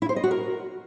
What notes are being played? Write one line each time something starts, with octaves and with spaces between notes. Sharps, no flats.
E4
C5
D#5
F#4
A#4